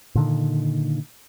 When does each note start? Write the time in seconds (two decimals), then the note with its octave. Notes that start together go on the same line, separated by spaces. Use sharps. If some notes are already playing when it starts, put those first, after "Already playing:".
0.15 A#2 D3 D#3